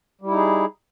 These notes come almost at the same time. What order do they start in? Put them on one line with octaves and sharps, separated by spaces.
G3 E4 D#4 G#4